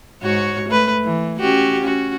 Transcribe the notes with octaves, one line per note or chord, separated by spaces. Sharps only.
G#2 F#4 C#5
A3 B4
E3
C#4 F#4 G4
C#4 F#4